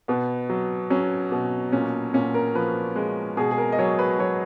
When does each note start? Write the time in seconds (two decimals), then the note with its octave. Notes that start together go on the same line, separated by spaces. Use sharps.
0.08 B2 B3
0.49 F#3
0.90 F#3 C#4
1.32 B2
1.72 A#2 C#4
2.13 A#2 C#4
2.34 A#4
2.55 F3 B4
2.96 G#3
3.37 B2 G#4
3.51 G#4
3.58 A#4
3.72 D#5
3.79 F#3 C#5
3.99 B4
4.19 F#3 C#5